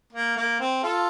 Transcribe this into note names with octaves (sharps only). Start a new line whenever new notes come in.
A#3
A#3
C4
F4 A4